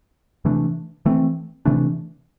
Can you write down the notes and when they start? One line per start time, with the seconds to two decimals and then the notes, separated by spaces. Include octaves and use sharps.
0.45 C3 E3 A3 D4
1.05 E3 A3 C4
1.65 C3 E3 A3 D4